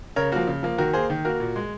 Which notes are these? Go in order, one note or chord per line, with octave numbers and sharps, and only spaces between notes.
C#3 A#4 C#5
F3 A#3 F#4
C#3
F3 A#3
D#3 F#4 A#4
A#3 G#4 C5
D#3
A#3 F#4 A#4
A#2
G#3